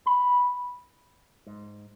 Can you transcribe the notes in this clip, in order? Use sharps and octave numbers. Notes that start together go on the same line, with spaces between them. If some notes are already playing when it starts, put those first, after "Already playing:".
B5
G#2